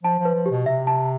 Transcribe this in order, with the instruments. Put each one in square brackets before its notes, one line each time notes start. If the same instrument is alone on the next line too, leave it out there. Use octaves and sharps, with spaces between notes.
[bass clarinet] F3 [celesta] A5
[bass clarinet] F3
[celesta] B4
[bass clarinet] F3
[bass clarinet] B2 [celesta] G4
[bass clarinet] C3 [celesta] E5
[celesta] A5